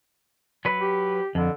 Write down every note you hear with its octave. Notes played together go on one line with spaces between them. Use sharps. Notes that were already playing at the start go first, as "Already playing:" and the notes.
F#3 B4
G4
F2 D3